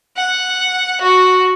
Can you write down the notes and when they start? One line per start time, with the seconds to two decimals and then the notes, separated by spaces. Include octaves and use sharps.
0.17 F#5
1.01 F#4